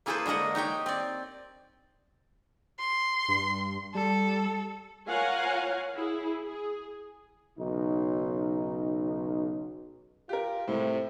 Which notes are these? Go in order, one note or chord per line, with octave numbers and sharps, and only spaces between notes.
A#3 E4 G#4 A4 B4 C5
D3 G#3 A#3 D#5 F#5
D#4 G4 C#5 G5
C4 D5
C6
G2
G3 A4
F4 A#4 C#5 F5 F#5 G#5
E4 G#4
G#4
B1 C#3 D#4
F4 G4 A#4
A2 C3